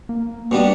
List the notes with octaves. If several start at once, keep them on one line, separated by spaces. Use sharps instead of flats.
A#3
B2 G3 A#3 B3 D4